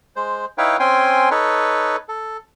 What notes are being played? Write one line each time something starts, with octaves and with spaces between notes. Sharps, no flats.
G#3 C5
D#4 E4 B4 C#5 F5 G5
C4 C#4 G5 G#5 C6
D#4 A4 B4 C#5
A4